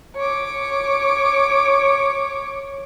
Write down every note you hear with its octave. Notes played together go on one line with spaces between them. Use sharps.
C#5 D6